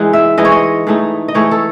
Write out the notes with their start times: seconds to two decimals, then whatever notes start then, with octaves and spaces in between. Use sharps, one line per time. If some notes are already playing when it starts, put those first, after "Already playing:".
Already playing: E3 G#3 D#4 F#5
0.13 E5
0.38 E3 G#3 D#4 D#5
0.45 C#5
0.52 D#5
0.87 G#2 E3 A3 D#4
1.28 D#5
1.34 G#2 E3 A3 D#4 C#5
1.51 A4